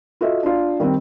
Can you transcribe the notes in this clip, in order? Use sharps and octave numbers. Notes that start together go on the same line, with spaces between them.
F4 F#4 A4 D#5 E5
D4 F4
D#3 G3 C4